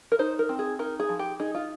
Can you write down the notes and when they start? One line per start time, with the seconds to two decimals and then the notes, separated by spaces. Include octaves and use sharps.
0.12 A#4
0.19 D#4 C5
0.39 A#4
0.49 C4
0.59 G#4
0.79 D#4 A#4
1.00 G#4
1.09 F3
1.19 G4
1.40 D#4 G#4
1.55 F4